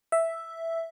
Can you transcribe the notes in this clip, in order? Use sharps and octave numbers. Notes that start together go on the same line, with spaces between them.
E5